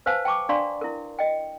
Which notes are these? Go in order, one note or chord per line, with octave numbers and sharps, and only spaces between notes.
B4 C5 F5 G#5 A5
G5 A5 C#6 D6
D4 D5 F5 A#5 C6 C#6
E4 A#4
D#5 G5